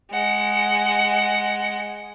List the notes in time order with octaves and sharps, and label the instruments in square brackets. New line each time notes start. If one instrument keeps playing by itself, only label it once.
[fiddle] G#3 F#5